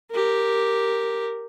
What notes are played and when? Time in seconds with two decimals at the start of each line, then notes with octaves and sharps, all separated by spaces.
0.12 G4 A#4